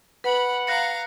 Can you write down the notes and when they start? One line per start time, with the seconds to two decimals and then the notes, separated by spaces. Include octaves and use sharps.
0.24 B4 F#5 B5
0.67 F5 A#5 F#6 A#6 C#7